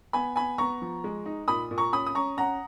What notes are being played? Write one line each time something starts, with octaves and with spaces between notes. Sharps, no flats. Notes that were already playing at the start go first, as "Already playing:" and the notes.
B3 G#5 B5
B3 G#5 B5
B3 A#5 C#6
F3
G#3
D#4
A#2 B5 D#6
A#2
A#5 C#6
C#4 B5 D#6
D#6
C#4 A#5 C#6
C#4 F#5 A#5